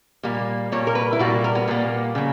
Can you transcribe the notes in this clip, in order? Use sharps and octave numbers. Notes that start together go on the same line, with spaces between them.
A#2 G3 A#3
A#2 G3 A#3 C#5
A#4
B4
E4
A#2 G3 A#3 F#4
A#4
B3
A#2 G3 A#3
C#3 F#3